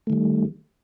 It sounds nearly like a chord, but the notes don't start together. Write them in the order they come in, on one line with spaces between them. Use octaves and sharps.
A3 D#3 G3